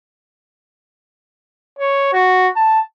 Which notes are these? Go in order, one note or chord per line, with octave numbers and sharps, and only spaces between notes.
C#5
F#4
A5